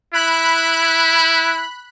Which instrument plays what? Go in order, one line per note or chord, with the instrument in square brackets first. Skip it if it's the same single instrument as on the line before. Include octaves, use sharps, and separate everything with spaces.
[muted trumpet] E4 [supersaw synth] B5 F#6